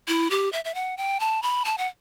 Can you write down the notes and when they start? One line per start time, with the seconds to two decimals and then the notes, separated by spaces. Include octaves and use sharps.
0.08 E4
0.31 G4
0.53 E5
0.65 E5
0.75 F#5
0.97 G5
1.20 A5
1.43 B5
1.65 A5
1.78 F#5